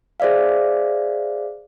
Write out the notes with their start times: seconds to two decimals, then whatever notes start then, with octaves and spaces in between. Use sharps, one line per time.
0.20 G#4 C5 D5 E5 F5